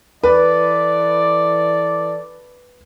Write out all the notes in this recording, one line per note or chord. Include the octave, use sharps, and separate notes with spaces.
E3 A4 B4 D5